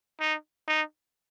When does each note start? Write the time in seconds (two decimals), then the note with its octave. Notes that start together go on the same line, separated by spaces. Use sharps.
0.20 D#4
0.68 D#4